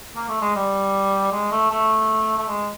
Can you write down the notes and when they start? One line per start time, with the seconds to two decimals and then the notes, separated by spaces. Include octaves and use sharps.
0.15 A#3
0.28 A3
0.41 G#3
0.55 G3
1.32 G#3
1.51 A3
1.70 A3
2.38 A3
2.47 G#3